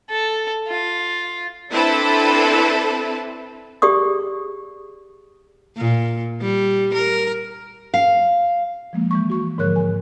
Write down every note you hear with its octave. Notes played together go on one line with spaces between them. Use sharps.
A4
F4
C4 D4 E4 A4 B4 A5
G4 G#4 D5 C#6 D#6
A#2
G3
A#4
F5
F3 G#3 A#3
E3 G#3 C#6
F#4 C#6
G#2 D3 F3 A#4 C#5 F#6
G#5